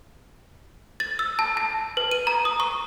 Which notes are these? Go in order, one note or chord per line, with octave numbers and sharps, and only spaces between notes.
A6
E6
A5
A5
B4
D#7
A#5
D#6
C#6